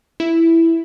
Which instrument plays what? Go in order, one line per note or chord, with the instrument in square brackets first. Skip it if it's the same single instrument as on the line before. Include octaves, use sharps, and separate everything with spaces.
[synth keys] E4